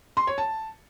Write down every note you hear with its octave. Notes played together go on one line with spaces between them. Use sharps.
C6
C#5
A5